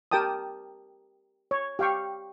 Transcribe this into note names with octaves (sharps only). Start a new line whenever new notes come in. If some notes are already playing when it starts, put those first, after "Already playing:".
G4 A#4 G5 A5 D#6
C#5
G4 F5 G5 C#6